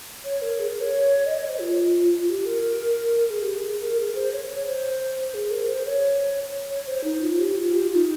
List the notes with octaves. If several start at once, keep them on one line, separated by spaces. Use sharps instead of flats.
C#5
A#4
G#4
A#4
C#5
D#5
C#5
C5
F4
G4
A#4
A#4
G#4
G4
G#4
A#4
G#4
C5
C#5
C#5
C5
G#4
A#4
C5
C#5
C#5
C5
D#4
F4
G4
F4
G4
F4
D#4